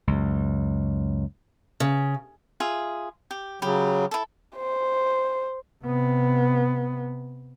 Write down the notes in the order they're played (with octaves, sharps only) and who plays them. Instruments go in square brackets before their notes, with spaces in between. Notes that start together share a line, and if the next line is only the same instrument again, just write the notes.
[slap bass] C#2 F#2
[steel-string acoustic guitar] C#3
[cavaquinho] F4 G#4 E5
G4
[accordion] C#3 F#3 [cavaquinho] G4 B5
[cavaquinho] E4 A4
[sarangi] C5
[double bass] C3 B3